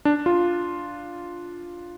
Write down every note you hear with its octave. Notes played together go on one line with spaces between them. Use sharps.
D4
F4